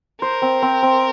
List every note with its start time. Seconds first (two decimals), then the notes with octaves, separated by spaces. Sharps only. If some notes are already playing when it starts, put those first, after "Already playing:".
0.22 A#4 C5
0.42 C4
0.62 C4
0.83 C4